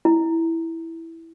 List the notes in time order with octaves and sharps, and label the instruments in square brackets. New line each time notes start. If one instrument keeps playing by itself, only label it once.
[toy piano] E4